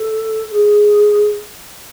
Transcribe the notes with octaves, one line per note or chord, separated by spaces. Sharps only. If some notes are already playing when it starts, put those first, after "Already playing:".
Already playing: A4
G#4